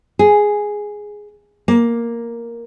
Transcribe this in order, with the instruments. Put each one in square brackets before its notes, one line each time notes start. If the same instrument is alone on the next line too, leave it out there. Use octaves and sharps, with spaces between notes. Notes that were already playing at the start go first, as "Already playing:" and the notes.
[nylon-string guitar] G#4
A#3